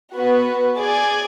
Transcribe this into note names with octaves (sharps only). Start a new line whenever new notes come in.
B3 F#4 B4
G#4 D5 G#5